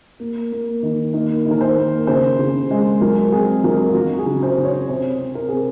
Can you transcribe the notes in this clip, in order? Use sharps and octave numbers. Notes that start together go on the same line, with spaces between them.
A#3
A#3
D#3
A#3 D#4
D#3
A#4
C5
A#3
C#3 C5
C#3
G#3
F#3 A#4
C4 G#4
F#3 A#4
F4
F#3 F#4
G#4
C#3
C5
C#3
C#5
C3 C5
C4
A#4
C3 G#4